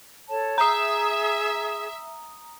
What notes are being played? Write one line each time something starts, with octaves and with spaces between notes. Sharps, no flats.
A4 C#5 A5
G#4 E5 A#5 D#6